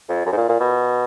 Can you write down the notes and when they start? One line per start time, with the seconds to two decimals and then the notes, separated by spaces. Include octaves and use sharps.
0.09 F2
0.26 F#2
0.32 G#2
0.37 A#2
0.49 A#2
0.60 B2